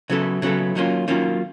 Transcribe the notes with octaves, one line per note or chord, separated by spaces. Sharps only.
C#3 F#3 B3 E4 A4
C#3 F#3 B3 E4 A4
D#3 F#3 A#3 C#4 F4
D#3 F#3 A#3 C#4 F4